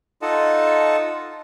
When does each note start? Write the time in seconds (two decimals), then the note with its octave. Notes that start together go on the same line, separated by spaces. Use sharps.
0.22 D#4 F4 A4 D#5 F#5 A5